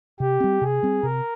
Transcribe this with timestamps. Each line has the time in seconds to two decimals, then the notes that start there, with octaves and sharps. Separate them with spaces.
0.20 C3 G4
0.40 G3 C4
0.61 C3 G#4
0.83 G3 C4
1.03 C3 A#4